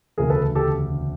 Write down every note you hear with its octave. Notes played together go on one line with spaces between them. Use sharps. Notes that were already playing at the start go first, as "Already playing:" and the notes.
E1 D2 C#3 G#4 A#4
A4 B4
G4 A4